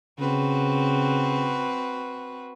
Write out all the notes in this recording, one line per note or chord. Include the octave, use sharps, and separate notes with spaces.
C#3 C4 F#4 B4